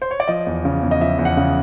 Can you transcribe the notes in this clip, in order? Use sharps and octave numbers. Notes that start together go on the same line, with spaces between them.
C5
C#5
D5
F3 D#5
E2
C#3
E2
D#5
F3 E5
E2
F#5
C#3